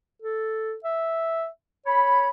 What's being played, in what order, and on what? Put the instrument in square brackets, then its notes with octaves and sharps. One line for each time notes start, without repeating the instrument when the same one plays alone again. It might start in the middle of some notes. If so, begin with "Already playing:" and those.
[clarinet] A4
E5
[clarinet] C#5 [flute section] B5